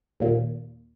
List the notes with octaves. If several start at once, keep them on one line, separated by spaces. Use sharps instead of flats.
D#2 A#2